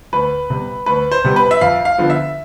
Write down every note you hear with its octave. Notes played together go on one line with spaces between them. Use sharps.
D2 B4
C3 G3 B3
D2 B4
C5
C3 G3 B3
B4
E5
F2 F5
F5
D3 F3 B3
E5